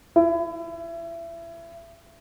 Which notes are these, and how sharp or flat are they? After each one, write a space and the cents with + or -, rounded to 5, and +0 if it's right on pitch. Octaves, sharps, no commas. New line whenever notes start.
E4 +25